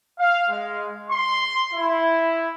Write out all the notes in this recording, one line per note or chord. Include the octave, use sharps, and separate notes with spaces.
F5
G#3
C6
E4